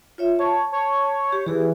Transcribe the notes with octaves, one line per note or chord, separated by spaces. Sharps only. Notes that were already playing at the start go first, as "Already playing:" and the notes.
F4 C#5 E5
C#5 A5
C#5
G4
E3 G4 G#4